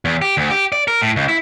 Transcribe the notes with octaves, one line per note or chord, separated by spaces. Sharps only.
E2
G4
D2
G4
D5
A#4
A2
C#2
E4